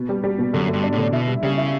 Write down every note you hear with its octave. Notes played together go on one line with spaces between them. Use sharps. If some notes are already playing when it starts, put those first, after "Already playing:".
Already playing: B2 B3
G3
G3
B2
F#2 D3
G2 A3
D4
A2
D3
B2 E4
G3
C#3 G3
E4